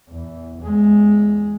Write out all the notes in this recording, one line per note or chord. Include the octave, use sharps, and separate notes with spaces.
E2
E2 G#3